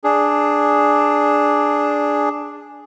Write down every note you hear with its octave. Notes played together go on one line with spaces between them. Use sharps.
D4 G#4